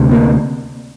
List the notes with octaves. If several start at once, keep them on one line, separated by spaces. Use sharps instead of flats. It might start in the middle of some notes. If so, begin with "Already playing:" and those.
Already playing: D2 C3
A#3